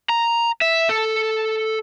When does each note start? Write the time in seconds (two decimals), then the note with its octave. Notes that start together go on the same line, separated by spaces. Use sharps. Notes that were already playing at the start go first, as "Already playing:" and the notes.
0.09 A#5
0.62 E5
0.89 A4